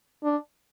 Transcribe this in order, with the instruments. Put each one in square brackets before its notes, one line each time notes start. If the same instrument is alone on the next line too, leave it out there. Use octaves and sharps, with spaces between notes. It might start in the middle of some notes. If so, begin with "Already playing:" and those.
[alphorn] D4